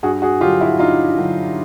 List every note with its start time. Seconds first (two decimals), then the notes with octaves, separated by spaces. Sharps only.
0.03 G2 F#4 G#4
0.22 F#4 G#4
0.41 D3 F#3 F4 G4
0.61 E4 F#4
0.79 G2 D#4 F4
1.18 D3 F#3